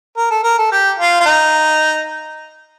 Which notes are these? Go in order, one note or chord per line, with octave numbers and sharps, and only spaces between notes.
A#4
A4
A#4
A4
G4
F4
F4
D#4